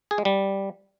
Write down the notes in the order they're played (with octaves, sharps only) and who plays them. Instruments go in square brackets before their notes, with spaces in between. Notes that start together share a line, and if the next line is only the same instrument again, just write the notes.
[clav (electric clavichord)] G#4
G#3
G3